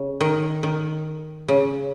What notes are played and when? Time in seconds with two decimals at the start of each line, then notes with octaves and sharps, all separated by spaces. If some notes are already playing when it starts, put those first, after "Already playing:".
Already playing: C#3
0.21 D#3
0.63 D#3
1.48 C#3